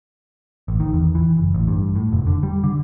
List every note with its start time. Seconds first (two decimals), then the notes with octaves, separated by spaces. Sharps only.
0.68 A1
0.80 D#3
0.93 E2
1.15 E3
1.37 F#1
1.54 A1
1.67 G2
1.96 A2
2.13 F1
2.27 D3
2.43 G3
2.64 D3